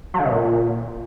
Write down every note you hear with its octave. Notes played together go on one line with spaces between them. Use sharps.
F#3
D3
C3
A#2